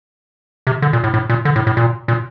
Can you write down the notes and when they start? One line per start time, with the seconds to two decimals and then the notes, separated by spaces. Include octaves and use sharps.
0.67 C3
0.82 D3
0.93 A#2
1.04 A2
1.14 A2
1.30 A#2
1.45 D3
1.56 A2
1.67 A2
1.77 A#2
2.08 A#2